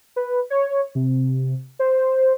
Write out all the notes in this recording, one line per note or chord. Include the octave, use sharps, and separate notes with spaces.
B4
C#5
C3
C5